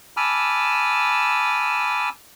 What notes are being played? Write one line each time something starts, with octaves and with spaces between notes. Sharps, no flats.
G#5 A5 B5 D6 E6 F6